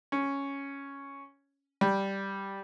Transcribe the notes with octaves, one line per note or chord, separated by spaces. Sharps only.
C#4
G3